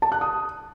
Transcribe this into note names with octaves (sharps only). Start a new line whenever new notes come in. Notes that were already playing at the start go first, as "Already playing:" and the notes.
A5
F#6
D#6